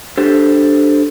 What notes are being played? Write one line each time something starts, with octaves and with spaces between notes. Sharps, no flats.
D4 G4 A4 C5